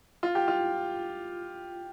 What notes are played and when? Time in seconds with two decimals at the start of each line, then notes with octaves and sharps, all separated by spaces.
0.23 F4
0.35 G4
0.48 F4